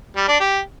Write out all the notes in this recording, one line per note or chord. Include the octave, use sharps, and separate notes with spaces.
G3
D4
G4